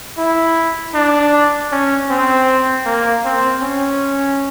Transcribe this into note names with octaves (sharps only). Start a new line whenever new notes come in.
E4
D4
C#4
C4
A#3
C4
C#4